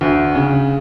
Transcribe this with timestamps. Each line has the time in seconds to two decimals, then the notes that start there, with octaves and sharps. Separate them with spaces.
0.01 D2
0.35 C#3